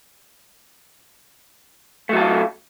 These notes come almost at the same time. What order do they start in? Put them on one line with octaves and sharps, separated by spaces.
A3 F#3 A4 F4